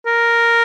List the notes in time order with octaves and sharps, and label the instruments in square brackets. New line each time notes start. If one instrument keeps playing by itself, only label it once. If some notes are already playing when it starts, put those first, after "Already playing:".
[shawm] A#4